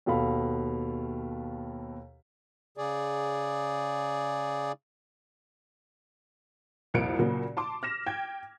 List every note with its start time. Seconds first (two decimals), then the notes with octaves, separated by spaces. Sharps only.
0.06 D#2 B2 A4 F5 B5
2.77 C#3 G#4 D5
6.94 C2 F2 A#3 C#7 D7
7.19 A#2 C#3 F#3 A#3
7.57 A5 C6 D6
7.83 F6 A#6 E7
8.06 G5 G#6